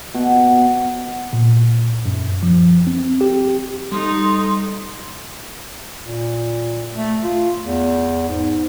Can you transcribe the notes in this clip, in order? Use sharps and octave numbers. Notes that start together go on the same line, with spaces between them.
B2
A#2
F#2
F3
C4
G4
G3 D#4 A4 C6 D#6
A#2
A3
F4
E2
G#2